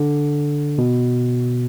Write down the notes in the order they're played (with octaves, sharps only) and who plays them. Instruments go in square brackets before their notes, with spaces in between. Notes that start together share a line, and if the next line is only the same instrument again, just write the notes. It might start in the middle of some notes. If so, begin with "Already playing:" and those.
Already playing: [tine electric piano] D3
B2